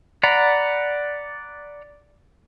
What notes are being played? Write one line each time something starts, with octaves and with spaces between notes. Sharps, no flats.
D5 F#5 A#5 B5